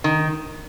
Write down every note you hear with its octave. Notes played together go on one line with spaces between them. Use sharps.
D#3